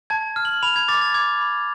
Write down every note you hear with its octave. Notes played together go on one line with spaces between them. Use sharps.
A5 G#6
F6
F#7
B5 F7
G#6
D6 A6
A6
D6 G#6
B5